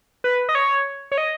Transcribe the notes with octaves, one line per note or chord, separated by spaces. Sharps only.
B4
D#5
C#5
C#5
D#5